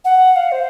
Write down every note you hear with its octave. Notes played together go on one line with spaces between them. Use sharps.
F#5
F5
C5